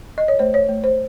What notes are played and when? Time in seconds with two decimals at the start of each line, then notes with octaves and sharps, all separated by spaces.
0.18 D#5
0.28 C#5
0.39 A3 C5
0.54 C#5
0.69 A3
0.84 C5